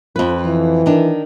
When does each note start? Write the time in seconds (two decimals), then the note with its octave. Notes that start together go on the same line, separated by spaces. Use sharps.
0.16 F2 F3 B4
0.45 E3
0.86 D#3 D4